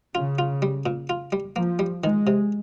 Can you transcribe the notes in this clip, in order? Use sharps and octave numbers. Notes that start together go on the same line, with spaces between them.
C#3 F4
F4
G3
A#2
F4
G3
F3 A#3
G3
D#3 G#3
C3